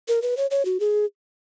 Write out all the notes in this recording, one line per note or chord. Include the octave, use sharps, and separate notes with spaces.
A#4
B4
C#5
C#5
F#4
G#4